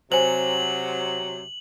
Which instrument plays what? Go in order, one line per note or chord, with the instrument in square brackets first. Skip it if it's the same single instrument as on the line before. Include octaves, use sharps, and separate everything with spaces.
[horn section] C3 F#3 [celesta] C5 G#5 [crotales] F#7